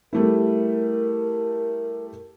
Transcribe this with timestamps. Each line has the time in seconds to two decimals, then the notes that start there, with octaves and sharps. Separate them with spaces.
0.13 G3 A3 E4 A#4